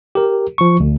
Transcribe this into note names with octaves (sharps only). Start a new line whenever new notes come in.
G4 A#4
F3 C#6
D2